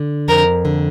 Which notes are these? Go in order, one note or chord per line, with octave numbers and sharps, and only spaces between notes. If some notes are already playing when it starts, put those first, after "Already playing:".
Already playing: D3
F2 A#4
D3